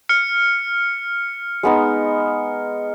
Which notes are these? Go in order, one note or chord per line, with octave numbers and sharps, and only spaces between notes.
F6 C#7
G#3 B3 D#4